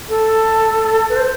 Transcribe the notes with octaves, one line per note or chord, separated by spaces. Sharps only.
A4
B4
C5